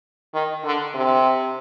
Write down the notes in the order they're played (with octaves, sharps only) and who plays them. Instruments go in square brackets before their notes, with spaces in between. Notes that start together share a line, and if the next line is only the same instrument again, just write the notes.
[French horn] D#3
D3
C3